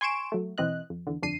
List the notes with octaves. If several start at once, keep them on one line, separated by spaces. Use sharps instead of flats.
G#5 C6 C#6 D7 E7
F#3 A3
B1 E3 C4 D#5 F#6
F2
E2 D3
G1 F2 D4 C7 D#7